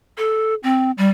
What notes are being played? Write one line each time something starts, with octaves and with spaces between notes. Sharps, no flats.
A4
C4
G3